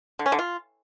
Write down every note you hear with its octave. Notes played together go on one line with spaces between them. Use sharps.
D3
C#4
D3
F4